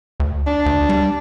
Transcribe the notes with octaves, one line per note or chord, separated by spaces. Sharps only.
D2
D4
D2
G3